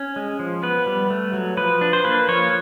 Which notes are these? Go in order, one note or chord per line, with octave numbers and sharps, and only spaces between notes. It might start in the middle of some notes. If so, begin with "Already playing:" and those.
Already playing: C#4
G#3
F3
B3 B4
G3
A3
F#3
F3 B4
D4
C5
A#3 B4
F3 C#5